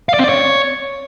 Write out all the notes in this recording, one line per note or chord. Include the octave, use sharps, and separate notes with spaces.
F5
D5
C4
D5
C#5